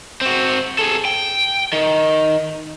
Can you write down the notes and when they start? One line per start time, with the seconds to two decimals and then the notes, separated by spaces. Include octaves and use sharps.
0.21 C4 F#4
0.79 G#4 A4
1.05 G5
1.73 D#3